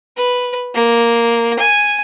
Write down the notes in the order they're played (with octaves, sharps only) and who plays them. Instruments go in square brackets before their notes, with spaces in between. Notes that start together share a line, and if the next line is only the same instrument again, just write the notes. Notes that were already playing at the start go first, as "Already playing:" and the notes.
[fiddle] B4
A#3
G#5